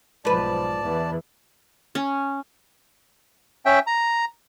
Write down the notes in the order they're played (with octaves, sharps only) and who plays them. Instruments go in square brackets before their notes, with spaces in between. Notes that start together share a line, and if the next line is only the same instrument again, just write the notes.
[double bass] B1 F3 [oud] G#2 B4 [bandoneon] D5 A5
[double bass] E2 E3
[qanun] C#4
[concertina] C#4 E5 G5
A#5